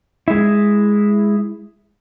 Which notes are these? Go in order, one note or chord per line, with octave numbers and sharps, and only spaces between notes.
G#3 E4